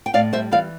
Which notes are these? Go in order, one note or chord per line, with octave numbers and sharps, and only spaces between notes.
G5
A2 D5 F5
G3 C5 E5
E3 D5 F5